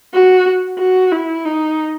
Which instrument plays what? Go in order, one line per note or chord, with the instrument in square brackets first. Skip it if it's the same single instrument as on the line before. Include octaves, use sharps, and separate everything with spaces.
[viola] F#4
F#4
E4
D#4